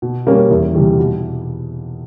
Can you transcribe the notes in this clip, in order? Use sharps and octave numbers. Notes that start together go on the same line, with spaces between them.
B2
G3 A#3 C#4
E2
C3 E3 G3
B2